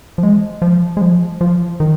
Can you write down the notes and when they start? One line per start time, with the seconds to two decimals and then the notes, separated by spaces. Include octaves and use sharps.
0.18 F3
0.23 G#3
0.62 F3
0.97 G#3
1.01 F3
1.41 F3
1.80 D#3